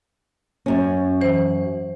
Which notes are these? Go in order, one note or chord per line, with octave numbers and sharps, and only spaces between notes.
F#2 C#4
E3 C5